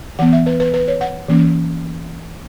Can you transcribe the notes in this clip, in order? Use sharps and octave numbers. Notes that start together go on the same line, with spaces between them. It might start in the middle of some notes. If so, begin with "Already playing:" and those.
E3 B3 F#5
E5
B4
B4
B4
C#5
F#5
E3 A#3 C#4